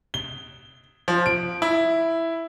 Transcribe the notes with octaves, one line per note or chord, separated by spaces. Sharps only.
G7
F3
D7
E4